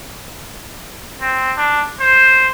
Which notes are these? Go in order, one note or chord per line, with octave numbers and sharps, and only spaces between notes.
C4
D4
C5